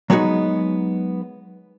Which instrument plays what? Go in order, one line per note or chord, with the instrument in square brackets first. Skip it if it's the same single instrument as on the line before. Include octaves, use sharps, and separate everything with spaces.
[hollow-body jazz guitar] F#3 G#3 B3 D#4 F#4